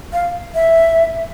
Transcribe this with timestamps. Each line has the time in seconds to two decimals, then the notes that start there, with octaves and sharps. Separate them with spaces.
0.13 F5
0.55 E5